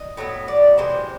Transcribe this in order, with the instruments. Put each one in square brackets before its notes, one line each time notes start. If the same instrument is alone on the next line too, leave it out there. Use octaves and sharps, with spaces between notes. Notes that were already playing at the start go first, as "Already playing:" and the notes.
Already playing: [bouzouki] D#5
A2 F#3 B3
D5
C3 E3 G#3 C5